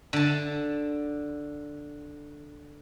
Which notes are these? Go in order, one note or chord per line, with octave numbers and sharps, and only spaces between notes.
D3 A5